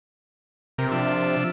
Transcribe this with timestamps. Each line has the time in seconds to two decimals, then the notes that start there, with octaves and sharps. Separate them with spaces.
0.78 C3 G4 A#4
0.92 F3 D4 E5